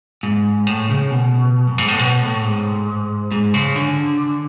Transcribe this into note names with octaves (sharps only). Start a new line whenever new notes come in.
G#2
A2
C#3
B2
F#2
G#2
A2
B2
A2
G#2
G#2
C#3
D3